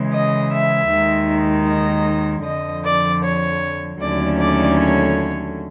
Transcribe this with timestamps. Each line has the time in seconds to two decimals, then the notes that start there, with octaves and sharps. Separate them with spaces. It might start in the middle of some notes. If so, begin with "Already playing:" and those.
Already playing: C#3 E3 G#3
0.13 D#5
0.52 E5
0.91 D#2 D#3 G#3
1.69 D#5
2.45 F2 D3 F3 D#5
2.85 D5
3.23 C#5
4.01 D#2 D3 F#3 A3 C#4 D5
4.39 D5
4.79 C#5